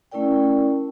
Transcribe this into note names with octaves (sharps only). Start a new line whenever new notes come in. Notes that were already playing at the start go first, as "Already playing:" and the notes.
A3 C#4 E4 A#4 D5 G5